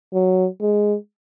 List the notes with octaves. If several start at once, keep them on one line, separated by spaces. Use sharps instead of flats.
F#3
G#3